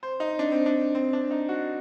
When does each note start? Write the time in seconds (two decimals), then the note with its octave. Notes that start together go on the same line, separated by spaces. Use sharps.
0.03 C5
0.20 D#4
0.39 D4
0.52 C4
0.66 D4
0.95 C4
1.13 D4
1.31 D#4
1.49 F#4